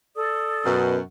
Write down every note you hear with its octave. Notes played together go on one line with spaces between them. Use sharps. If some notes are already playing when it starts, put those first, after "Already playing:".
A4 D5 D#6
F#2 B2 F#4